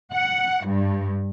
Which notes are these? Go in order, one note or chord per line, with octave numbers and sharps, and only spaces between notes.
F#5
G2